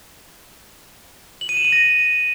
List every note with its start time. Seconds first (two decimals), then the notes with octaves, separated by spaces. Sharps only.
1.41 F#7
1.49 D#7
1.57 E7
1.65 D#7
1.72 A#6